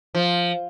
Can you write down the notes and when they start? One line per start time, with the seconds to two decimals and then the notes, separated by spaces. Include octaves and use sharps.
0.15 F3